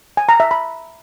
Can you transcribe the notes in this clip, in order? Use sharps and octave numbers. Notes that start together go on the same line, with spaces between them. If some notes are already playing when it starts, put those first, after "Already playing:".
G#5
A#5
E5
B5